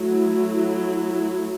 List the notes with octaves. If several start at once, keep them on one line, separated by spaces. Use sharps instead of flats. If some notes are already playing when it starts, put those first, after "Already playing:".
Already playing: F#3 A3 E4